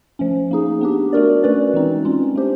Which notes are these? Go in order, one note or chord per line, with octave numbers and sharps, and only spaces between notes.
F3 A3 C#4
A#3 D#4 G#4
B3 D4 G4
A3 D4 F#4 A#4 D5
A3 C#4 F#4 B4 D5
E3 G#3 C4 D#4
G#3 C#4 F4
A3 D4 G4 C5